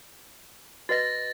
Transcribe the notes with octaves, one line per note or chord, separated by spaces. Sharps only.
F#4 B4 D#5 A6 A#6